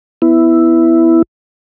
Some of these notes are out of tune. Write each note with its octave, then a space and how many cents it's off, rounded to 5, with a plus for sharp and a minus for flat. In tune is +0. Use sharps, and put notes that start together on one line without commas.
B3 +10 E4 +0